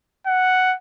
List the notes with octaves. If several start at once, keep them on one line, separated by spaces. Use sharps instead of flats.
F#5